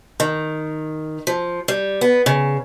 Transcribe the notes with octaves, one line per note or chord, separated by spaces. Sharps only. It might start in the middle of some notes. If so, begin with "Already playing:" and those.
D#3
F3
G3
B3
C#3